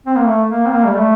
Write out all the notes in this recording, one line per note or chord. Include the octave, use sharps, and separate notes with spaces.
C4
A#3
A3
A#3
C4
A#3
G3
A3